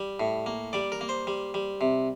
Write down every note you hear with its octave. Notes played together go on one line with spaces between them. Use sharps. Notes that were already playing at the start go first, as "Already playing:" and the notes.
Already playing: G3
A2
A#3
G3 D5
A#4
A#3
C5
G3
G3
C3